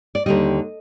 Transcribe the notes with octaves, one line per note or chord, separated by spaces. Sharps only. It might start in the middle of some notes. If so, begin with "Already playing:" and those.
D5
D#2 D3 G3 D#5